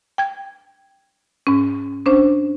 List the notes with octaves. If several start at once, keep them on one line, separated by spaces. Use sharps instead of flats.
G5 G#6
G#2 C#4
C#4 D4 C5